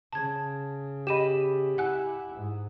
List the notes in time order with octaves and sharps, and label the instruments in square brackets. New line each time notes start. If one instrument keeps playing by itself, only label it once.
[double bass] C#3 [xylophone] A5 G#6
[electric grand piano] G4 B5 [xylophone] D#5 D#7 E7
[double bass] E4 [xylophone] F#5 G#5 F#6
[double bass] G#2